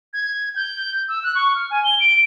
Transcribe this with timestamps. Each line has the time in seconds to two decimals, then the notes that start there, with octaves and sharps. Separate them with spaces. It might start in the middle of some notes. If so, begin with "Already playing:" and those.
0.13 G#6
0.56 G6
1.09 E6
1.24 F#6
1.35 C#6
1.55 F6
1.71 G#5
1.84 G7
2.00 D7